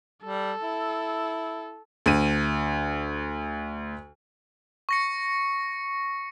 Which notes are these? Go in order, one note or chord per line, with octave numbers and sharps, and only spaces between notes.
G3 A4
E4
D2 D#7
C#6 A#6 C#7